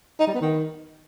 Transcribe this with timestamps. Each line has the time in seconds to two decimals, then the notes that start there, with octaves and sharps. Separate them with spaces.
0.20 D#4
0.27 G3
0.34 B3
0.42 D#3